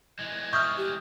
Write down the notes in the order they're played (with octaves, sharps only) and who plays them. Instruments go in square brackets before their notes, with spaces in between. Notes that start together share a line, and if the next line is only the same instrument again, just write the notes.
[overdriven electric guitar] E3 G#3
[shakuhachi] E5 [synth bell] C#6 D#6 F6 [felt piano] G6
[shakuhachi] G4